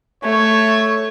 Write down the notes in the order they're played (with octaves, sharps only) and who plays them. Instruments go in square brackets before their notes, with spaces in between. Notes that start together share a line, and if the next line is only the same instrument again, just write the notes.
[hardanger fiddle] A3 [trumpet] C#5